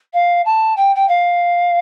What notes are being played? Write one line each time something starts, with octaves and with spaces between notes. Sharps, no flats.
F5
A5
G5
G5
F5